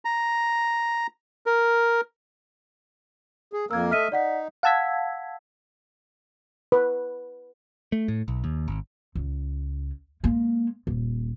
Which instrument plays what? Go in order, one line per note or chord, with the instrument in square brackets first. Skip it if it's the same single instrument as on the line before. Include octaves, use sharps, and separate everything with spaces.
[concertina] A#5
A#4
[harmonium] G#4
[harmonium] F2 A#3 A#4 [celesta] E6 G#6
[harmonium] A3 D#5 E5 [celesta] F6 B6 D#7
[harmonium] D#4 [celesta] D5 F#5 B6
[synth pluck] F5 F#5 A5 E6 G#6 B6
[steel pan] B4
[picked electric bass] A3
A2
B1
D#2
G#1
[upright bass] C#2
G#3 A#3
D#1